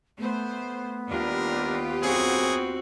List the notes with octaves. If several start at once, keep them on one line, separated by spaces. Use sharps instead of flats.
A3 B3 C5
D#2 G3 D4 F4 G4 A#4
F#2 C4 F#4 G#4